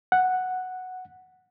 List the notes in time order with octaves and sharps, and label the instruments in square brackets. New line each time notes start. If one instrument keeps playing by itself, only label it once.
[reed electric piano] F#5